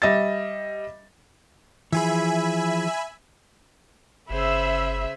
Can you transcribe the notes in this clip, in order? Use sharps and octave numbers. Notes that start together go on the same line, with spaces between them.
G3 D#5 E5 A6
E3 F3 G#4 E5 G#5 B5
G1 C#3 G#4 C5 E5 B5 E6